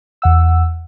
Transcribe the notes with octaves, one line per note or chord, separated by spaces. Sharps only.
E2 F#5 E6